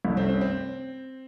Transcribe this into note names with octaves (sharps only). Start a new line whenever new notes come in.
C2 C3 A3
C4
C4
C4